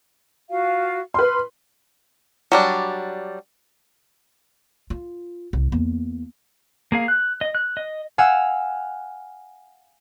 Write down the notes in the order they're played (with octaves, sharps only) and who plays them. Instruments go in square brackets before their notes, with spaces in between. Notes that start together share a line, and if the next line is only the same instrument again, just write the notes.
[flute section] F4 F#4 F5
[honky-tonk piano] B4 C6 [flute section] F6
[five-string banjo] F#3 G3 D4
[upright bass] F4
C2
E2 A#3
[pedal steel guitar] A#3 G#4 F5
F#6
D#5
F#6
D#5
[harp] F5 F#5 G#5 E6